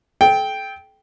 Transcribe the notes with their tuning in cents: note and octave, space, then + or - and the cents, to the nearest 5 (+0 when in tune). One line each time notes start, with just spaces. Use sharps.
A4 -40 G5 +0